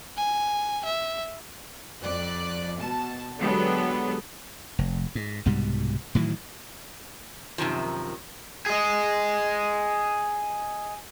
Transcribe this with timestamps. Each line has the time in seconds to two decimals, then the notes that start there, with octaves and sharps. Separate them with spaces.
0.17 G#5
0.85 E5
2.01 F2 D5 F#6
2.79 B2 A5
3.38 D3 F#3 G#3 B3 G4 A4
4.79 F1
5.15 G#2
5.46 C2 G#2 B2 G3
6.15 A2 D#3 E3 F#3
7.58 F#2 C3 D#3 F3
8.66 G#4 D#5